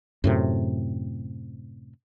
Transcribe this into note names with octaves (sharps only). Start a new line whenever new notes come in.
F#2 A2 C3